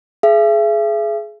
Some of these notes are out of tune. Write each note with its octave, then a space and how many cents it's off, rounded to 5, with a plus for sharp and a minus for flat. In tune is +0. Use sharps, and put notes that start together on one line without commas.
G#4 +25 E5 +40